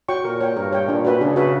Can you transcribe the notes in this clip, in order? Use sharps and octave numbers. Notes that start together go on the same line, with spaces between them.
F#4 C#5 G5 C#6
A#2 A#4
C#5 G5
G2 A#4
C#5 G5
A#2 D4
F#4 B4 E5
C#3 D4
F#4 B4 E5